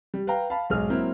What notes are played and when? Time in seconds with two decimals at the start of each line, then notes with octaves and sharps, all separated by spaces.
0.14 G3
0.27 B4 F5 G5 A#5
0.50 F5 A5 B5
0.70 B1 G#2 G#3 G#4 F6
0.90 F#3 A#3 C4 E4